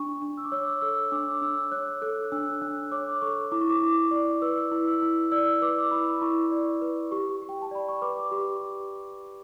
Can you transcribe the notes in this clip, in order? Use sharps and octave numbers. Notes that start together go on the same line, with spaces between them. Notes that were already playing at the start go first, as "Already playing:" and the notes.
Already playing: D4 C#6
D4
E6
D6
C#5 E6
A4 E6
D4 D6
D4 E6
C#5 F#6
A4 F#6
F#6
D4 E6
D4 F#6
C#5 D6
A4 C#6
E4 D6
C#6
D6
E4
D5
B4 E6
E4
E6
E4
D5 E6
B4 D6
E4 B5
E4 C#6
D5
B4
G4 C#6
G4
G5
A5
D5 B5
C#6
B4 D6
G4